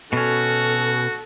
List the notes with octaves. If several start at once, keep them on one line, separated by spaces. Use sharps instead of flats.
B2 C#4 F#4 A4